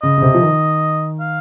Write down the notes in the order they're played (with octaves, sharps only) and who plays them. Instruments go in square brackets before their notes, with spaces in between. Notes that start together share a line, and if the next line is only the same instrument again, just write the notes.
[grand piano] C#3 [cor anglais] D#5
[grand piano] C#3
C3
F3
D#3
[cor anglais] F5